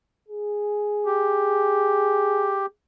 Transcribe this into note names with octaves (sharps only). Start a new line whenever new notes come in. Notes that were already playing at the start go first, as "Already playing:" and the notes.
G#4
G4